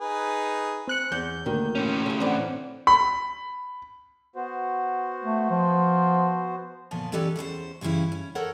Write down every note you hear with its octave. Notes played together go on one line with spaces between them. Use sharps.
D#4 G#4 B4
C4 F#6 C#7
E2 G6
D2 D#3 A#3
A2 C#4
C#3 G#4
D3 E3 C4 F#5
B5
B3 F#4 C5
A3
F3
D2 A#2 F3 B3 G#5 A5
E3 C#4 G4 A4 B4 D5
E2 C#4 G#4 C5
G2 C#3 E3 C#4 E4
C#4
A4 A#4 C5 C#5 F#5